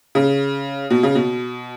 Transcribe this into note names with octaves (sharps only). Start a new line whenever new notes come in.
C#3
B2
C#3
B2